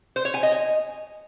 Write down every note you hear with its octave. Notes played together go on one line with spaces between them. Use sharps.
C5
C#5
G#5
D#5
G#5